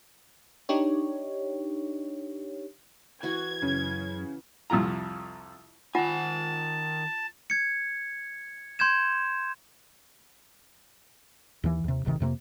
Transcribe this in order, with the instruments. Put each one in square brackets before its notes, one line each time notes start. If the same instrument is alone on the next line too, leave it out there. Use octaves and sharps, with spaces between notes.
[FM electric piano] D4 D#4 G4 C#5
[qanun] E3 F#4 [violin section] G#6
[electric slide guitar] F#2 C#4 [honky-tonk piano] C#3
[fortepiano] C2 F2 E4 F4 A#5
[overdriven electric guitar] D#3 G#5 [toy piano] F4 F#5 [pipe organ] A5
[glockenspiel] G#6 C#7
C6 G6 G#6 E7
[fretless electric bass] D#2 E3
D#2 C3
D1 G#1 C3 D#3
F2 C3 A3 A#3